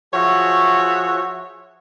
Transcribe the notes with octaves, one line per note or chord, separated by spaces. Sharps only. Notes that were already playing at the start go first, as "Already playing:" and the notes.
F3 F#4 G#4 C#5 E5 F#5